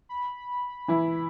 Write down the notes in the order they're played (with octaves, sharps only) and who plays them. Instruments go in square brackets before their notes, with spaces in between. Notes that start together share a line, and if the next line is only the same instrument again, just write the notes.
[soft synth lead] B5
[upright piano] E3 E4